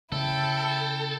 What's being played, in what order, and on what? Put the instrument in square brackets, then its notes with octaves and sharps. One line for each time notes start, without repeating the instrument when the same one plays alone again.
[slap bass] C#3 [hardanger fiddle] E4 G5 [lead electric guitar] A4